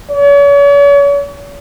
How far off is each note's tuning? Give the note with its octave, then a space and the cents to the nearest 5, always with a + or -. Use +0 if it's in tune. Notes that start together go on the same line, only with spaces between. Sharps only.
C#5 +40